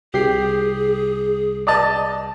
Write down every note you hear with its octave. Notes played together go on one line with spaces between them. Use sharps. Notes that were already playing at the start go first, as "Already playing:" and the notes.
C2 G4 G#4 C7
D5 D#5 A5